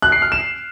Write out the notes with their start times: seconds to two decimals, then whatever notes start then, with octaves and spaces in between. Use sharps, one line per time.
0.02 F#6
0.12 C7
0.22 F6
0.32 E7